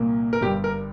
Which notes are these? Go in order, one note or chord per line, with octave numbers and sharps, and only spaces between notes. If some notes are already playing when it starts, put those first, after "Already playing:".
Already playing: C2 A#2 A#3
A#4
G1 G2 G3 G4
A#4